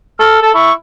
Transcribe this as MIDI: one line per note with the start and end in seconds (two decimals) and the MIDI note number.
0.19 0.40 69
0.19 0.41 89
0.42 0.53 69
0.42 0.51 81
0.54 0.71 64
0.54 0.73 85